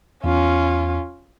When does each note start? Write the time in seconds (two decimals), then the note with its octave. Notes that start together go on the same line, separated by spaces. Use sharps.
0.24 E2 C#4 F4